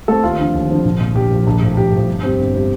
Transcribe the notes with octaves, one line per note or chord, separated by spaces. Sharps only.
A3 C4 A4
D#2 F4
D3 F3 C4
D#2
D3 F3 C4
A#1
A#2 F3
A#1 G4
A#2 F3
A#1
A2 F3
A#1 G4
A2 F3
G1
F2 C3 G3 C4
G1
C3 G3 C4